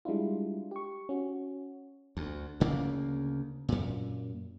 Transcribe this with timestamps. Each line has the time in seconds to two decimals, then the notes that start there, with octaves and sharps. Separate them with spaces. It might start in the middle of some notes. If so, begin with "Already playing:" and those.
0.05 G3 G#3 D4 E4 F4
0.71 G4 C#6
1.09 C#4 F#4
2.17 D2
2.60 D2 C#3 A#3
3.69 F#2 A#2